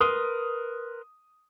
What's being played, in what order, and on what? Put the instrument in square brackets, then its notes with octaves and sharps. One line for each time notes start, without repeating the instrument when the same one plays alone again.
[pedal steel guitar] A#4 B4 C6 [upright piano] D#6